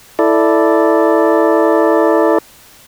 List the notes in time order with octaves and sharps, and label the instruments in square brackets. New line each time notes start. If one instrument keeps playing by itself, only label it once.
[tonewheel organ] E4 A4 D5